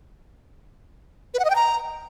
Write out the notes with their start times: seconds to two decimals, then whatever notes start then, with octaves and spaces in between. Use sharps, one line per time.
1.34 B4
1.39 F#5
1.45 D#5
1.50 G5
1.55 A#5